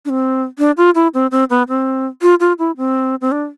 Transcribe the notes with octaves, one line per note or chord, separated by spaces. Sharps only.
D4
C4
D4
F4
E4
C4
C4
B3
C4
F4
F4
E4
C4
C4
D4